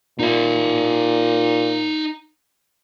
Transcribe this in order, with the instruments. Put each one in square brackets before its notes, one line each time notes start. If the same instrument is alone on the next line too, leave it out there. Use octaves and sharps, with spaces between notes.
[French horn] A#2 [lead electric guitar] D#4 E5